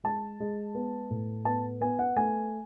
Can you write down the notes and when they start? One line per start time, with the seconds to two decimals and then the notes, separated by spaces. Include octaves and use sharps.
0.04 G#3 A5
0.40 G#3
0.75 B3
1.10 A2
1.45 B3 A5
1.81 B3 G#5
1.99 F#5
2.16 A3 G#5